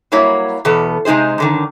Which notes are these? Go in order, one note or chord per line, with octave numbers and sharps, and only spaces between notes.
F#3 G3 A#3 E4 C#5
E2 B2 B3 A4
C3 G#3 D#4 G#4 C5
F#2 D3 D#3